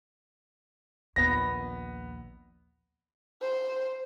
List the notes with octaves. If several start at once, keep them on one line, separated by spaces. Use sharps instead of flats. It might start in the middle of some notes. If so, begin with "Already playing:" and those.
A#1 D#2 B3 A#6
C5